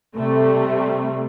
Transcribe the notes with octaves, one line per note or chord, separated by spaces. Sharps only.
C3 G3 A3